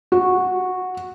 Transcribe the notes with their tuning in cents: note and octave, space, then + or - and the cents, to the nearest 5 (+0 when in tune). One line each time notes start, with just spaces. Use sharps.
F#4 -10